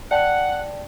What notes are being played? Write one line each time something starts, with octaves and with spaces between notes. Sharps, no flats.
D5 F#5 G5 A5